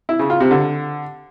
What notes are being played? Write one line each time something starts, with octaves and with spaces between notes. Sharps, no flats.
E4
C#3
F4
C3
D3